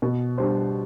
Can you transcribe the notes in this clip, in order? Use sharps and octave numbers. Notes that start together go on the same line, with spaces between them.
B2
G3 D4 G4 C5